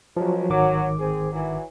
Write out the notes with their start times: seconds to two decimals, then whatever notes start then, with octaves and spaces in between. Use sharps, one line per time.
0.17 C#2 F3 F#3
0.49 G#1 D#3 F#3 D6
0.99 C4 G#4
1.33 E3 F#3